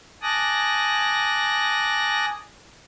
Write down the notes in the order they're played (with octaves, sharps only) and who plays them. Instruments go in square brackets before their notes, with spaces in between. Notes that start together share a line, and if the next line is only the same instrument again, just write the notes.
[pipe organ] G#5 A5 D6 D#6 F#6 A#6